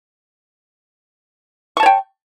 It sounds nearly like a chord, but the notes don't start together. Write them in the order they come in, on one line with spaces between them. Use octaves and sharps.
C#6 A5 C#5 G5